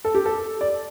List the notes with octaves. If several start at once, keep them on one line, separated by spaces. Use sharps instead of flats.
A4
G4
A4
D5